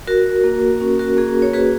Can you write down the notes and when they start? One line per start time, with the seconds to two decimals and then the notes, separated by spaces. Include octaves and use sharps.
0.07 F#4 A#4
0.44 A#3
0.81 C#4
0.99 F#4 A#4
1.17 A#3 G#4
1.42 C#5
1.53 F#4 G#4 B4